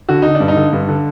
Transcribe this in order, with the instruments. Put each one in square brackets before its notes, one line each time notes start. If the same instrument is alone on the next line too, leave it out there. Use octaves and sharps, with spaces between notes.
[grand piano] D3 F#4
D3 D#4
D4
G2
D#4
D3
G2
D3